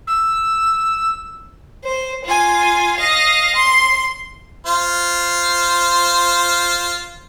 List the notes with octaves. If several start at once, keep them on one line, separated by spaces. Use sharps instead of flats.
E6
C5
F4 G#5
D#5 F5
C6
F4 C5